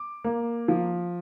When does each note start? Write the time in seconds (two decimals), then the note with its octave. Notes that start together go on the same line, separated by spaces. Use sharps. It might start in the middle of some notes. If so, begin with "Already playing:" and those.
Already playing: D6
0.24 A#3
0.68 F3